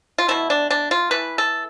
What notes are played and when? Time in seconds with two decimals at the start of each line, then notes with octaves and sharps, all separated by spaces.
0.18 F4
0.28 B2 A3 E4
0.50 D4
0.71 D4
0.91 F4
1.11 E3 A3 B4
1.38 A4